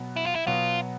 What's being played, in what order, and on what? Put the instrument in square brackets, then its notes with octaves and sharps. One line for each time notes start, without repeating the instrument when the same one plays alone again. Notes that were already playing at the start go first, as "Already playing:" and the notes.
Already playing: [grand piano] B2 F#3 B3
[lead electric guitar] E4
F4
E4
[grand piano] B2 F#3 B3 [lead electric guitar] F4